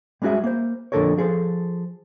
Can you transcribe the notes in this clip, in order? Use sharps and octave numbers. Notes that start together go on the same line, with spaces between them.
G3 G#3 C#4 F#4 G#4 E5
A#3 C5
F2 A#2 D3 A4 A#4 C#5
F3 G#4 A4 C5